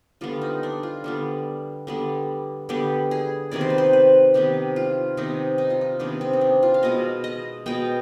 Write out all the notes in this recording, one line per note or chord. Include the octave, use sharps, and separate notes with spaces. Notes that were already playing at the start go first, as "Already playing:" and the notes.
D3 G3 B3 F4
D#4
D4
F4
D3 G3 B3
D3 G3 B3
D3 G3 B3 G4
G#4
C3 D#3 B3 D5
C5
B4
C5
B4
C3 D#3 B3 G4
F4
C3 D#3 B3 D#4
D#4
F4
D#4
C3 D#3 B3 D4
C4
D#4
D4
F4
F5
B2 G#3 B3 D#5
D#5
B2 G#3 B3 G5